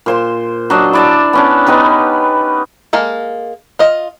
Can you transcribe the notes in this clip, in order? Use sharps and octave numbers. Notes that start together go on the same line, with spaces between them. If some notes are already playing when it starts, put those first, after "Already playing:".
A#2 C5 C6
F#3 D4 C5 D#5
E4 D5 A5
B3 C#4 D4
B3 D#4 G4 B4
G#3 A#3 A4
F4 D#5